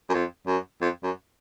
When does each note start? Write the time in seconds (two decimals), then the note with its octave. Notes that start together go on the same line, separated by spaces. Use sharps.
0.09 F#2
0.14 F2
0.47 F#2
0.81 F2
1.03 F#2